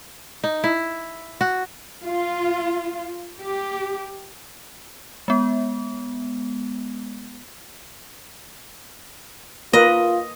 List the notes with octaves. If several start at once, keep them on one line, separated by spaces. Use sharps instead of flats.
D#4
E4
F#4
F4
G4
G#3 B3
A#3 F4 A#4 B4 D#5